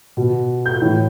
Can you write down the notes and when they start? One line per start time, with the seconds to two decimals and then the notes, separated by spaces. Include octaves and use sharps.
0.17 B2
0.66 G6
0.82 A2 E3